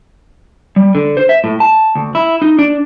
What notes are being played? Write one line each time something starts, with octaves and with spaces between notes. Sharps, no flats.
G3
D3
C5
E5
A2
A5
D2
E4
D#4
D4